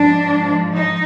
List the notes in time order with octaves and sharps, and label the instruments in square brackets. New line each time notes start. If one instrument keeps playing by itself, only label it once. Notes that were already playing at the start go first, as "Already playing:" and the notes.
Already playing: [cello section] G#2 F3 G#3 D4
D#4